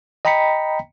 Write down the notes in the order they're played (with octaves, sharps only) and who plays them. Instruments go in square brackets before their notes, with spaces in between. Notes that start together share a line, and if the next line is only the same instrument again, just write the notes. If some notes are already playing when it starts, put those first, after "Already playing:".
[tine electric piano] D#5 G5 A#5 B5 B6 C#7